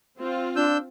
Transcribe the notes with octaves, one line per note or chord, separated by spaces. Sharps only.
C4 F4
D4 E6 G6